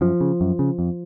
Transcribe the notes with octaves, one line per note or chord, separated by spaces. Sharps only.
F#2 F3
C#3
F#2
C#3
F2